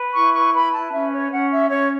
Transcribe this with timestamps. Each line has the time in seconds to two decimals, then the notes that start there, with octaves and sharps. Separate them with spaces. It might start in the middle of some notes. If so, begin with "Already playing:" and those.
Already playing: B4
0.14 E4 C#6
0.33 C#6
0.53 B4 B5
0.72 A5
0.92 C#4 E5
1.12 C#5
1.31 C#4 F#5
1.51 E5
1.70 C#4 C#5